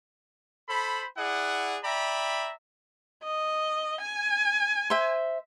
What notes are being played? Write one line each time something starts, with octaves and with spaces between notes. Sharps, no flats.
A4 C5 B5
E4 G#4 D5 F#5
D5 E5 G5 A#5 B5
D#5
G#5
C5 E5